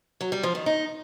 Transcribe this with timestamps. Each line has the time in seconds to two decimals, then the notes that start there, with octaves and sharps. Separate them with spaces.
0.21 F#3
0.32 G3
0.43 F3
0.55 D#3
0.66 D#4